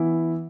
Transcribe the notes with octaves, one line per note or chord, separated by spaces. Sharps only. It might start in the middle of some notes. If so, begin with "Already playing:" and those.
Already playing: E3 B3 E4